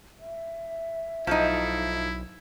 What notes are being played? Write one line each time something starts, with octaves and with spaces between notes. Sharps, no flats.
E5
B1 F3 A3 D#4 E4